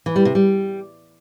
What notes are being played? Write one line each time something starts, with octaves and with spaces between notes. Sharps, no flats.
E3
G3
C3
G3